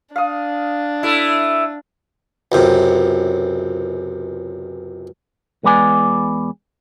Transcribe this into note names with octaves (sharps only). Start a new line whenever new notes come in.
D4 F5 D#6
A3 E4
C#2 F#2 C3
E2 G#3 B3 D5 G#5